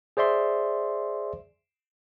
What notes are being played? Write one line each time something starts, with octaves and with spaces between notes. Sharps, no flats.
G#4 C5 D5 E5 C6